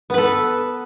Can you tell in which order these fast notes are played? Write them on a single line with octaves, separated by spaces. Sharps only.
B3 B4 A4